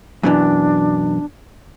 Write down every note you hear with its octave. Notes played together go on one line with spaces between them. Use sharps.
F#2 B2 E3 D4